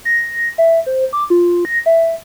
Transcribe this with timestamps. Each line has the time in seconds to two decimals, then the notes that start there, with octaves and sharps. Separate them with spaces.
0.05 A#6
0.58 E5
0.86 C5
1.13 D6
1.30 F4
1.65 A#6
1.86 E5